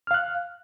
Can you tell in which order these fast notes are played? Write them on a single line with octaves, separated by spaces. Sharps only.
F6 F5 F#6